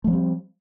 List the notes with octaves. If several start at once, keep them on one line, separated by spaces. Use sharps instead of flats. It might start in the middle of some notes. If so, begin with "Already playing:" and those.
F3 G3 A3 C4